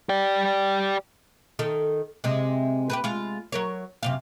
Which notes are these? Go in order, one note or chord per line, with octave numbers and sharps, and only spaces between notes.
G4 D5
D#3 A4
C3 G#3
G4 A#4 B4
G#3 F4
F#3 A#4 C#5
F#2 C3 F5